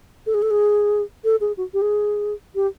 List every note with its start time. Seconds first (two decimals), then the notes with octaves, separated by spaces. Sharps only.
0.26 A4
0.34 G#4
0.42 A4
0.51 G#4
1.24 A4
1.41 G#4
1.57 F#4
1.74 G4
1.82 G#4
2.55 G4